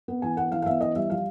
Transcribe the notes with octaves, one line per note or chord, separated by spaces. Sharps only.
B3
E3 G#5
B3 F#5
E3 F5
F5
B3 E5
E3 D#5
G3 E5
F3 F5